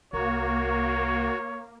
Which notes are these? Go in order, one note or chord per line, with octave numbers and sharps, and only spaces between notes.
C2 A#3 F#4 C#5